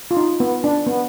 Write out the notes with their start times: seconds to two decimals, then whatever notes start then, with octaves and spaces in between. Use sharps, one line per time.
0.11 F4
0.17 D#4
0.40 B3
0.64 D4
0.87 B3